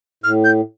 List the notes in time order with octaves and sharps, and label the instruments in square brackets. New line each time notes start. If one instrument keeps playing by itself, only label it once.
[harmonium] A2 [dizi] F6
[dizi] G6